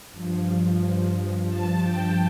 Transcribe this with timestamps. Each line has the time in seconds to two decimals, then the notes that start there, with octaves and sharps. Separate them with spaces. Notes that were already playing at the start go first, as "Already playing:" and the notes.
0.12 G2 F3
1.47 A5
1.81 G5